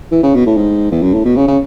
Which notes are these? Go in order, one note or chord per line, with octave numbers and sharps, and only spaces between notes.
E3
C#3
B2
A2
G#2
E2
F#2
A2
B2
C#3
C#3